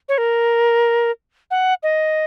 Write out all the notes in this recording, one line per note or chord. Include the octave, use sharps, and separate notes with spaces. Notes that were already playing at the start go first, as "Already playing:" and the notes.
C#5
A#4
F#5
D#5